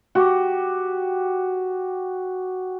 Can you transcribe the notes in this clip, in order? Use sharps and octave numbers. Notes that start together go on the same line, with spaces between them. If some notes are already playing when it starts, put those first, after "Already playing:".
F#4 G4